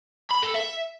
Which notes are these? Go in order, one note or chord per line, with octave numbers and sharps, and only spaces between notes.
B5
A4
E5